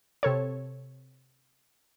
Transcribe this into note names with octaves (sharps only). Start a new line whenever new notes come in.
C3 A4 C#5